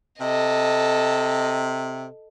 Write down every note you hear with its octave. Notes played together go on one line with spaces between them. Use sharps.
C3 A4 D#5